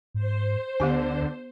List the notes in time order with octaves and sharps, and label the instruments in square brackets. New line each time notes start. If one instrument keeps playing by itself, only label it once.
[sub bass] G#2 [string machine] C5
[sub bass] D2 [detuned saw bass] D3 [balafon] B3 G4 G#5